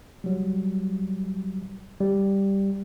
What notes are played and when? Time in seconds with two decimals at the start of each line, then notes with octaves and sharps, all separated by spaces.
0.24 F#3 G3
2.00 G3